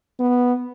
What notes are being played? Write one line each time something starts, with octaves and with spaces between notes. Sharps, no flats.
B3